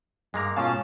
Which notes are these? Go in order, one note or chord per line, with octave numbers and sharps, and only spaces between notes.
G2 G#3 A#3 A#5
G#2 B2 C#4 F4 F5 A5